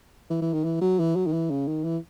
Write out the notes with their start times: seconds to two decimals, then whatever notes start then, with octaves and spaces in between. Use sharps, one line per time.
0.30 E3
0.42 E3
0.53 D#3
0.64 E3
0.81 F#3
0.99 E3
1.16 F#3
1.27 D#3
1.33 E3
1.50 C#3
1.68 D#3
1.84 E3